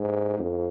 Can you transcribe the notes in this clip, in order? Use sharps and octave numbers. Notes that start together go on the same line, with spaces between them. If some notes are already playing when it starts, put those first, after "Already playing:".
Already playing: G#2
F2